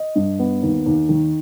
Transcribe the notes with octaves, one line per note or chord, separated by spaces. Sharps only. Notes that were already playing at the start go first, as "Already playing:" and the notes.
Already playing: D#5
G2
B3
D#2
D#2
D#3